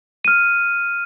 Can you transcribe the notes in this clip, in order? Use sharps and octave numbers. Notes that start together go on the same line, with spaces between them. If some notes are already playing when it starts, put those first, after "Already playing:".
F6 D#7